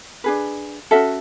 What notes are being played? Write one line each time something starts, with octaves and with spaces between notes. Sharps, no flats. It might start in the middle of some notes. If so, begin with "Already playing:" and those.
D4 G#4 B4
C#4 F#4 A4 E5